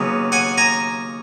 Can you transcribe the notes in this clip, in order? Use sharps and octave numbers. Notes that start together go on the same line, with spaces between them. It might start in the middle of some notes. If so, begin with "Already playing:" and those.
Already playing: D#2 C#3 F#3 B3
F#5 G#5
G#5 A#5